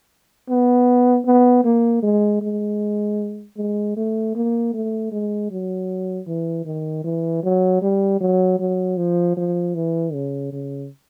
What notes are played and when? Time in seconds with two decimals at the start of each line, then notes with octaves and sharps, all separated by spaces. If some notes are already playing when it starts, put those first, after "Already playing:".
0.49 B3
1.26 B3
1.65 A#3
2.03 G#3
2.42 G#3
3.57 G#3
3.96 A3
4.35 A#3
4.74 A3
5.12 G#3
5.50 F#3
6.27 E3
6.66 D#3
7.04 E3
7.43 F#3
7.82 G3
8.21 F#3
8.59 F#3
8.97 F3
9.37 F3
9.75 E3
10.13 C#3
10.53 C#3